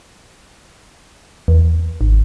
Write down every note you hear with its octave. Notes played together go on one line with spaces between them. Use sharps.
E2
G#1